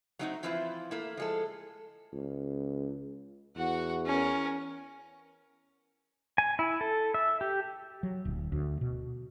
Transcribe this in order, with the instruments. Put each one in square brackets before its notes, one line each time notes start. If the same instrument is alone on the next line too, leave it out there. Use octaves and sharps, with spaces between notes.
[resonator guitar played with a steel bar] F#3 A3 C4 D#4 F4 F#4
E3 F3 C4 E4 F4 B4
A3 A#3 E4
F3 G#3 A4
[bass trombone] C#2
[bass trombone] E2 [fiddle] F#4 F#5
[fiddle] C#4 A#4
[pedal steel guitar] G#5
E4
A4
E5
G4
[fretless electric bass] F#3
D1
D2
B2